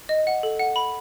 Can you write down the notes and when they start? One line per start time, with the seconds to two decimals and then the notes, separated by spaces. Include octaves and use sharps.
0.09 D#5
0.27 F#5
0.43 A4
0.59 F#5
0.76 B5